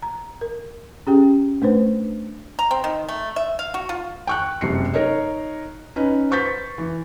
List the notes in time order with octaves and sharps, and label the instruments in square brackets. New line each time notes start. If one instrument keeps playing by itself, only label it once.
[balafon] A#5
A#4
C#4 G4 G#4 G5
A3 D4 B4 C5
[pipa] A#5
C4
D#3
A3
E5
F5
F#4
F4
[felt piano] G5 C#6 F#6
F#1 C3 C7 C#7
D#4 A#4 C#5 D#5
C#4 D#4 B4
B4 C5 C#6 G6 A6 B6
E3